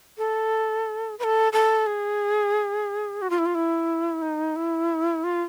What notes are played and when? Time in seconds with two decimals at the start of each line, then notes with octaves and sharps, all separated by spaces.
0.18 A4
1.19 B4
1.24 A4
1.53 A4
1.86 G#4
3.22 F#4
3.30 F4
3.38 E4
3.46 F4
3.55 E4
4.22 D#4
4.56 E4
5.24 F4